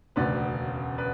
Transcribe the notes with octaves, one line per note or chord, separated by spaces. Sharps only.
E1 D2 C#3 B4 D5
B4 D5